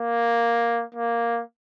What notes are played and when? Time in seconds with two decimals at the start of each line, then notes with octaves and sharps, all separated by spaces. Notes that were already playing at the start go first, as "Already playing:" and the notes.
Already playing: A#3
0.94 A#3